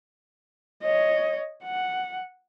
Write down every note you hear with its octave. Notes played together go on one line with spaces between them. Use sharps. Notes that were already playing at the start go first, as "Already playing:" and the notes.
C#5 D#5
F#5